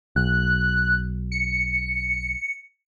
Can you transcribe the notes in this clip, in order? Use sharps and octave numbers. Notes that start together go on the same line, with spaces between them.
B1 F#6
C#7